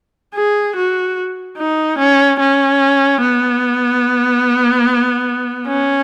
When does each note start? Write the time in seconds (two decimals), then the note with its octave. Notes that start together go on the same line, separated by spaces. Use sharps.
0.35 G#4
0.76 F#4
1.57 D#4
1.98 C#4
2.40 C#4
3.21 B3
5.67 C#4